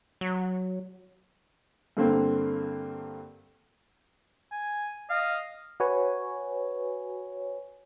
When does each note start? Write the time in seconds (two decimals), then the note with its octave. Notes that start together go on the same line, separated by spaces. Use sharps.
0.21 F#3
1.97 G2 D3 A#3 C4
4.52 G#5
5.10 D#5 F5
5.80 F#4 B4 C#5 G#5